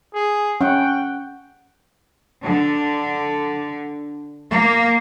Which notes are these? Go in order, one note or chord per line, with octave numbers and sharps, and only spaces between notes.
G#4
C#4 F#5 G5
D3
A#3